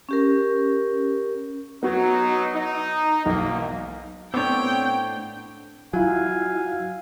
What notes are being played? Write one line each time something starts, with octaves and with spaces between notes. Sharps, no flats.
C#4 G4 A#4
F#3 B3 D#4 F#4
D#4
B1 E2 G#2 A#3
A2 B3 C4 D4 C#5 G5 D6
F#3 E4 F4 F5 G#5